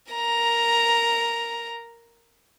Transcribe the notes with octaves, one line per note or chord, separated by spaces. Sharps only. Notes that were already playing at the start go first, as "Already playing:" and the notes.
A#4 A#5